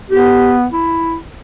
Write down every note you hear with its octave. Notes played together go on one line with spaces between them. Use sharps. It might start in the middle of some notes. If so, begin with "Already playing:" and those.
B3 G4
E4